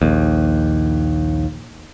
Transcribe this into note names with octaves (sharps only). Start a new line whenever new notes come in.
A#1 D#2